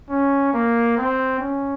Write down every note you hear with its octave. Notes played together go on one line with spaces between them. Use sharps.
C#4
A#3
C4
C#4